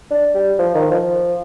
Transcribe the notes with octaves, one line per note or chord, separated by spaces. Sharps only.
D4
G3
F3
D#3
F3